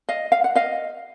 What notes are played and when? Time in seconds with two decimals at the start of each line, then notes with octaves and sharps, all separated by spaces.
0.09 D#5 F5
0.32 F5
0.44 F#5
0.55 D#5 F5